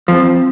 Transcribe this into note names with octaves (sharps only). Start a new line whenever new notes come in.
F3 C4